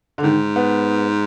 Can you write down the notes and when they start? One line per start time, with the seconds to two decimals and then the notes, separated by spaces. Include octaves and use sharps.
0.18 D3
0.23 G#2 D#3
0.56 B3